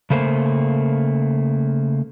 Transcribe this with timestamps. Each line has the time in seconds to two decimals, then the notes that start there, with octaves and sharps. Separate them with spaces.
0.10 C#3 A3 A#3 C5